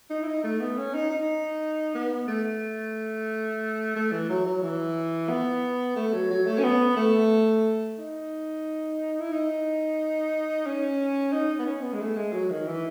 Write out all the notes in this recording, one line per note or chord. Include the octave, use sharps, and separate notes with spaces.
D#4
E4
D#4
A3
B3
C#4
D#4
D#4
B3
A3
A3
E3
F#3
F#3
E3
B3
A3
F#3
F#3
A3
C#4
B3
A3
D#4
E4
D#4
C#4
D#4
B3
C#4
B3
G#3
A3
G#3
F#3
D#3
E3